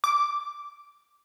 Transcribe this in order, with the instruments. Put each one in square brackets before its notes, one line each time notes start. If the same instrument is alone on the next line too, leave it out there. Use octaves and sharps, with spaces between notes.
[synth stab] D6